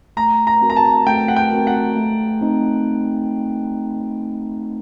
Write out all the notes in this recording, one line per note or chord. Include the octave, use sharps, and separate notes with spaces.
A3 A#5
A#5
C4 F#4 A#4
A#5
A5
A3 G5
F#5
G5
C4 F#4 A#4
F#5
A3
C4 D#4